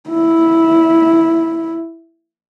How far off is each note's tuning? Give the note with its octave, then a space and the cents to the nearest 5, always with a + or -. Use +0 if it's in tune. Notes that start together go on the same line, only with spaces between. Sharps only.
E4 -5